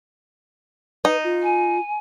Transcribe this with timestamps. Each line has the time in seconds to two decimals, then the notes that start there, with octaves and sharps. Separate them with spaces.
1.05 D#4 B4
1.24 F4
1.42 G#5